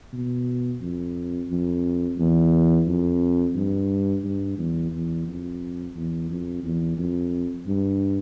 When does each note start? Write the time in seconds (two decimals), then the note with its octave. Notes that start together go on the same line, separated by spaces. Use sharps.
0.13 B2
0.81 F2
1.49 F2
2.19 E2
2.87 F2
3.55 G2
4.24 G2
4.58 E2
4.92 E2
5.27 F2
5.96 E2
6.30 F2
6.63 E2
6.98 F2
7.67 G2